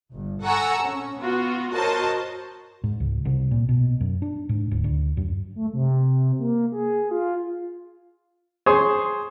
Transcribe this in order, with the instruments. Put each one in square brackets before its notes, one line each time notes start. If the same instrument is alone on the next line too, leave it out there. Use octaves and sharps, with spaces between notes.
[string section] G1
A4 F#5 G#5 A#5 C#6 E6
C#4
B3 F4 F#4
F#4 A#4 C5 C#5 D#5 A5
[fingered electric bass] G#2
C#2
C2
A#2
B2
F#2
D4
G#2
D1
D2
F#2
[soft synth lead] A3
C3
A#3
G#4
F4
[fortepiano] G#4 C5 C#5 G#5